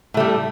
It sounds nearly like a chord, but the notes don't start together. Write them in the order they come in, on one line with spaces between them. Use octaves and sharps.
A2 A3 G3